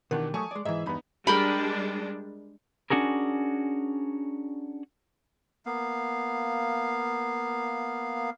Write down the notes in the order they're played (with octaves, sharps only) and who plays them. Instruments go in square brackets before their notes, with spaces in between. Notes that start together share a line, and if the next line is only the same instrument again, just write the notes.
[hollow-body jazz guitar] B2 D#3 G4 [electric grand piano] E3 D4 F#5 [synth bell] A#4
[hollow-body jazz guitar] F#3 G3 A3 [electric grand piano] G#5 C#6 D#6 [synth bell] A5
[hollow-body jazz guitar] G#3 D5
[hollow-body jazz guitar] G#2 E3 [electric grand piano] G#4 E5 [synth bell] D#5
[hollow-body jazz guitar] E2 G2 B5 [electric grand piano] B3 D#4
[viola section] G3 G#3 D4 [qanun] A#4 G5 B5
[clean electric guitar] C#4 D4 F#4 G#4 A#4
[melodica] A#3 B3 F5